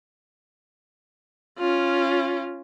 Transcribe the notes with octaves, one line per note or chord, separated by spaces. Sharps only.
C#4 F4